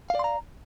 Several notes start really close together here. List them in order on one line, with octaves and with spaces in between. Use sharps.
F5 D5 C6 A#5